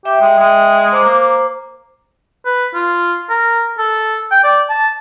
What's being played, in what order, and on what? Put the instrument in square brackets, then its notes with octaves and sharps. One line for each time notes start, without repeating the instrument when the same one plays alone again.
[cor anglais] G4 [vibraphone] E5 G5
[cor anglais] G#3
G#3
[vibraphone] C5 A#5 D6
[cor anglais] A#3
[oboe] B4
F4
A#4
A4
G5
D5
A5